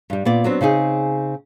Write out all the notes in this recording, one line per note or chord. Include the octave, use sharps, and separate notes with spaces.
G2 G3
A#2 B3 D5
F#3 B3 C4 D4
C#3 C4 D#4 G#4